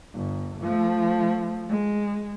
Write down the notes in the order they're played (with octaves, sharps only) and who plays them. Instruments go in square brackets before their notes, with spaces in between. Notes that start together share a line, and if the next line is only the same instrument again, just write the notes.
[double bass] G1
F3 A3
G#3